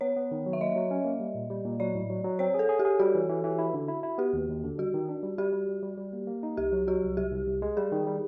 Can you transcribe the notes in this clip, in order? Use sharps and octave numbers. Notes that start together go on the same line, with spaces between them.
B3 C#5
B3
D#3
F#3
E5
A#3 D#5
F#3
C#4
A#3
G3
A#2
G3
A#2
F#3 D5
A2
F#3
F#3
C4 C#5
G#4 A4
G#4
G4
G#4
G3 F#4
E3
E3
E3
E4
D3
E4
E4
B3 G4
D#2
D#2
D3
G3 F#4
D#3
D4
G3
G3 G4
G3
G3
G3
G3
A#3
A#3
D#4
C2 G4
F#3
F#3 F#4
C2
C2 G4
C2
C2
G#3
G3 G#4
D#3
G3